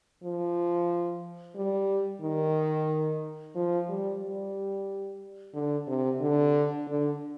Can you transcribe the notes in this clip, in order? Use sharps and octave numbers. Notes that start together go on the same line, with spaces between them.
F3
G3
D#3
F3
G3
G3
D3
C3
D3
D3